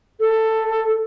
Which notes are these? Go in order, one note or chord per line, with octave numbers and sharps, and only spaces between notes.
A4